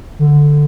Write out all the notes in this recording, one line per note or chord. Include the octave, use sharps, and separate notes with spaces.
D3